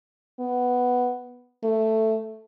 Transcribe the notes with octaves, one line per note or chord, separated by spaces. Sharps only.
B3
A3